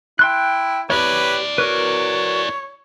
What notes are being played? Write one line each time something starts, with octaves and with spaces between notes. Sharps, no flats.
E4 G5 C6 F#6
E4 G4 B4 C#5 D5
F#4 A#4 B4 C#5